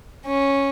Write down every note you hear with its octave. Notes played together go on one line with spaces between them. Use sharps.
C#4